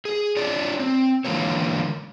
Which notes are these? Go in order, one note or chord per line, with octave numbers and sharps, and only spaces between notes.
G#4
D4 F4 C#5 D5
C4
D3 E3 G#3 A#3 F4 C#5